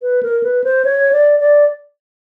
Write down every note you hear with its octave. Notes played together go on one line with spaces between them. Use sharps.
B4
A#4
B4
C5
C#5
D5
D5